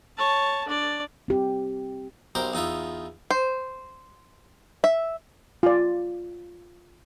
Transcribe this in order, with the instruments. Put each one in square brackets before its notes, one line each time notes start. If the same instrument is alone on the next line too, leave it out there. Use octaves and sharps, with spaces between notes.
[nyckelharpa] C#5 A5
D4 D5
[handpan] C4 G4
[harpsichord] B1 G4 A#4 C5
E2 D#4 F4 E5
[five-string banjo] C5
E5
[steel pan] F4 D5